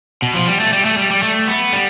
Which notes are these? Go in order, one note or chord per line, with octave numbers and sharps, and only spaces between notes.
B2
F3
G3
A3
G3
A3
G3
G3
A3
B3
G3